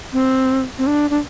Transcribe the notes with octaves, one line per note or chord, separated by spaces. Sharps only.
C4
C4
D4
D4